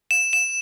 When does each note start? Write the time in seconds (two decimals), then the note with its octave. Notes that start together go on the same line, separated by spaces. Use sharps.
0.11 E7
0.33 E7